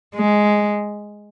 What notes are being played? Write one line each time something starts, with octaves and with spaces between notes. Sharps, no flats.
G#3